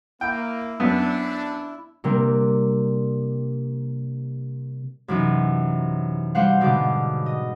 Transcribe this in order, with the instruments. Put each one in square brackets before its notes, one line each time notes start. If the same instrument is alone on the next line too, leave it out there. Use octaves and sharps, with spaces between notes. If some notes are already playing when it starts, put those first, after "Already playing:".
[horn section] A#3 [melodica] E4 [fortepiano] G5
[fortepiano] F#2 B3 [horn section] D4
[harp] C3 G3 A#3 D4
F#2 C3 E3 C#4 D#4
G3 C4 C5 F5 F#5
G#2 B2 D3 B3 D6
D#5